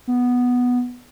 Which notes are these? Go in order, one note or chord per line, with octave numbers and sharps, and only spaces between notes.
B3